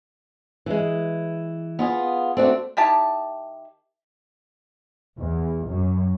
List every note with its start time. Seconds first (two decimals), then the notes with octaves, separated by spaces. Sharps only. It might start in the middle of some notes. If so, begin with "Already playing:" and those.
0.66 E3 G#3
1.79 B3 F4 G#4
2.37 A3 C4 D4 F#4
2.77 D#3 E4 G4 A5
5.17 E2
5.67 F#2